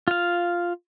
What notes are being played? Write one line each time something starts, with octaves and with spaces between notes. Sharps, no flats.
F4 F5